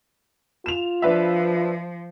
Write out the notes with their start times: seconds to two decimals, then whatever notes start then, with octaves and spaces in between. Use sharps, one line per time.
0.66 F4 E7 F7
1.02 F3 D4 B4 E5